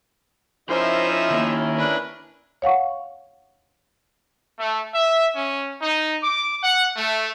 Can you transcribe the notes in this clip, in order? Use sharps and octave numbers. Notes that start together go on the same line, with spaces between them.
F3 C#4 D#4 E4 A#4 C5 E5
D#3 A#3
D4 B4
C#5 F5 F#5 C#6
A3
E5
C#4
D#4
D6
F#5
A3